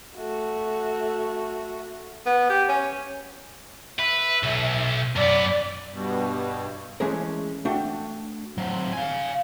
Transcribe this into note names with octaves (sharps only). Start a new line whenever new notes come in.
A3 F#4
B3
G4
C#4
B4 E5
B1
F#2 B3 D5
G2 B2
E3 G#3 A3 C#4 G#4 A#4
A3 D4 F#4 F#5 G5
F#3 C4
F5 G#5